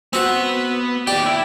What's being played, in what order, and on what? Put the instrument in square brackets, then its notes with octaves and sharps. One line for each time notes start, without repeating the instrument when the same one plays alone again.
[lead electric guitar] B3 F#5 [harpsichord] C4 F#4
[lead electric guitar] D#2 D5 [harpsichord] G4 [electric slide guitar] G5
[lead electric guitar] E4